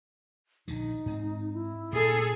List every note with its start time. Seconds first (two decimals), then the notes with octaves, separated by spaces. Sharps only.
0.68 A#1 D3 D#3 D#4
1.06 G#2 C4
1.54 E4
1.93 A#2 G#4 A4